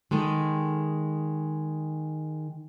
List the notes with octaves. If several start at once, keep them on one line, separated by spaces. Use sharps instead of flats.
D#3 G#3 G#4 A4